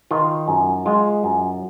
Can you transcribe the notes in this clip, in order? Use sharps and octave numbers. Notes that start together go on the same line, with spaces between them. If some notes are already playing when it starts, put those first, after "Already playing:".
D#3 F4
F#2
G#3 F4
F#2